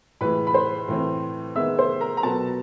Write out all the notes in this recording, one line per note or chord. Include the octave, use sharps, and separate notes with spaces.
A2 E3 G#3 B4 B5
B5
C5 C6
A2 E3 A3 C4
D#3 G#3 B3 E5 E6
C5 C6
A#4 A#5
A#5
B2 F#3 B3 A4 A5